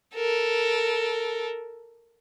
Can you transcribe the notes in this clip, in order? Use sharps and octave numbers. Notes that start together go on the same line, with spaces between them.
A4 A#4